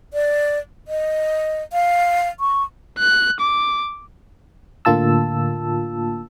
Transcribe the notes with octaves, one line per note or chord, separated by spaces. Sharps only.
D5
D#5
F5
C#6
F#6
D6
A2 D3 A#3 F4 A5 E6